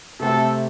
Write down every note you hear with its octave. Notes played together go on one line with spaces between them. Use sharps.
C3 A3 C4 G4 A4